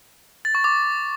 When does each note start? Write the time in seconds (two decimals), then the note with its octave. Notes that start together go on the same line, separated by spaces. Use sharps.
0.45 A6
0.55 C#6
0.64 D6